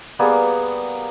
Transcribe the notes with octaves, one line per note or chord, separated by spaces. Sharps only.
G3 A#3 B3 G#4